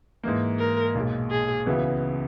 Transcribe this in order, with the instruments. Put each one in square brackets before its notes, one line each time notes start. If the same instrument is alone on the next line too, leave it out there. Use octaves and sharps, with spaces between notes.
[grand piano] G#2 E3 A#3
[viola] A#4
[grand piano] B1 A#2 G#3
[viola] G#4
[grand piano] C#2 C#3 E3 B3 F#4